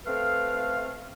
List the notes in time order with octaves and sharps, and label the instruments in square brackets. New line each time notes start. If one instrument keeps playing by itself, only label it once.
[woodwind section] A3 C4 A4 B4 F5